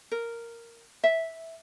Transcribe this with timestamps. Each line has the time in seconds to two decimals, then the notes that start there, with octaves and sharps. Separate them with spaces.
0.11 A#4
1.04 E5